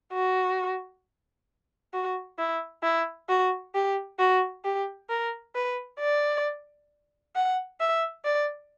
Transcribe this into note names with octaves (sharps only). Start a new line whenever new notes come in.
F#4
F#4
E4
E4
F#4
G4
F#4
G4
A#4
B4
D5
F#5
E5
D5